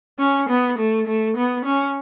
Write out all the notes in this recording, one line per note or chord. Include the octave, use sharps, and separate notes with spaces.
C#4
B3
A3
A3
B3
C#4